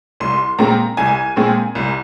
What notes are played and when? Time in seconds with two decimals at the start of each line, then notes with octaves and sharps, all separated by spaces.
0.20 C2 C6
0.58 A#2 G#3 C4 A#5
0.97 C2 G#5
1.36 A#2 G#3 C4
1.75 C2